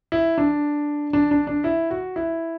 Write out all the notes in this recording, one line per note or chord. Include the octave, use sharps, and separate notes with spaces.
E4
D4
D4
D4
D4
E4
F#4
E4